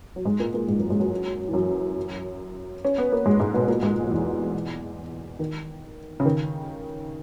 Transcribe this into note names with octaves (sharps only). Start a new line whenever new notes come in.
F#3
G#2 G#3
A#2 A#3
A#2 A#3
G#2 G#3
F#2 F#3
G#2 G#3
F#2 F#3
E3
F#2 F#3
C#4
B3
A#3
G#2 G#3
G#2 G#3
B2 B3
A#2 A#3
G#2 G#3
F#3
E2 E3
D#3
C#3
D#3